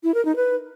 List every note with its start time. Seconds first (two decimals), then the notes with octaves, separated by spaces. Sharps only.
0.03 E4
0.14 A#4
0.25 D#4
0.36 B4